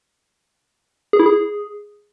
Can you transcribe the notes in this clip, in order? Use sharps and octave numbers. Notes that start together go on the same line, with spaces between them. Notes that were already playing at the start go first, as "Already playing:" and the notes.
G#4
E4
G#4